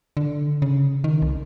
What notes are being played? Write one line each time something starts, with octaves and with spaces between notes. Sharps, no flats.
D3
C#3
D#3
C2